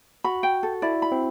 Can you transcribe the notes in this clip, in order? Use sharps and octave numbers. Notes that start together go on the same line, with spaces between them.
F#4 B5
G5
A4
E4 D5
B5
C4